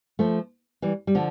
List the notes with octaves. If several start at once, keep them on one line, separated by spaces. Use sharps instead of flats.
F3 A3
E3 G3
G3
D3 F3